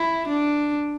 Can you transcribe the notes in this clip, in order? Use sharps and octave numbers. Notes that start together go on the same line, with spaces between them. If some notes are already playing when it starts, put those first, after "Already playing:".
Already playing: E4
D4